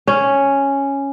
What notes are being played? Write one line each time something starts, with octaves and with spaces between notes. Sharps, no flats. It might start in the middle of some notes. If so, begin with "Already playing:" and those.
C#4